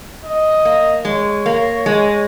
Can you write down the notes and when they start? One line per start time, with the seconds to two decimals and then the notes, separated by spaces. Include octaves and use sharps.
0.24 D#5
0.65 A#3
1.05 G#3 C#5
1.46 A#3
1.86 G#3